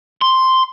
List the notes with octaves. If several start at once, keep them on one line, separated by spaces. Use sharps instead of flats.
C6